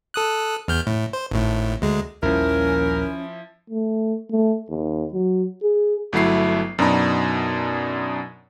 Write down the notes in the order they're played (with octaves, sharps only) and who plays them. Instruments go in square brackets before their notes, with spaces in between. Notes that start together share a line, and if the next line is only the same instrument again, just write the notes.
[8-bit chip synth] A4 D#6 F#6
E2 F6 G6
A2
C5
G#1 A2
D2 G#3
[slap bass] A#1 D#2 G3 [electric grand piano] F3 E4 [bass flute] C#4 [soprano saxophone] A#4
[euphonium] A3
A3
D#2
F#3
G#4
[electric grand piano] G1 F#3 A3 E4 C7
F#2 B2 D4 D#4 A#5 B5